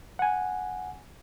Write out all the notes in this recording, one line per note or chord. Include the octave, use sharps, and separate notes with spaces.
F#5 G#5